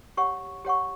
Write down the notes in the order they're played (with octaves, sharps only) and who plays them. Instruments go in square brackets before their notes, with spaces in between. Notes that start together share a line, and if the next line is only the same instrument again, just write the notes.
[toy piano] G4 C#5 F#5 C#6
G4 C#5 F#5 C#6